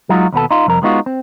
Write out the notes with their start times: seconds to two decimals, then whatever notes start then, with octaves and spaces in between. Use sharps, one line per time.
0.09 F#3 G#3 D#4 F4 F#4
0.33 D#2 B2 B3 A4
0.51 D#4 F4
0.67 C2 F2 A#4
0.83 G#3 B3 D#4 F4 F#4
1.06 C4